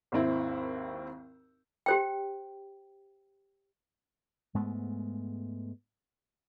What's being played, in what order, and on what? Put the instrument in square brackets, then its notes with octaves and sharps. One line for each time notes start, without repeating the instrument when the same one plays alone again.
[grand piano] G#1 D#2 C4 E4
[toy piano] G4 C5 G5
[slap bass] G#2 G#3 A3 B3